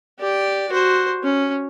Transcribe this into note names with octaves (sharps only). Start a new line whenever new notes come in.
G4 D5
F#4 C5
C#4